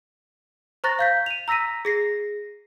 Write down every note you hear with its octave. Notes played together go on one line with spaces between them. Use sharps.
C5 A#5 C#6 F#6 A6 A#6
F5 G6 B6
D#7 F7
A#5 E6 A#6 B6 D#7
G#4 A#6 C7